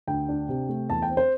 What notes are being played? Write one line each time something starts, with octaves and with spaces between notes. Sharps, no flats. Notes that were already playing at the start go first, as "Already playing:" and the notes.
D2 G5
D4
C3
A3
E2 A5
G5
C4
C5